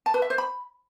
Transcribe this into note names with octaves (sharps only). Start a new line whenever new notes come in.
A5
B4
E5
C5
B5